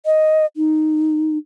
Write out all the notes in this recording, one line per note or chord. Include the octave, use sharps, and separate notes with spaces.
D#5
D#4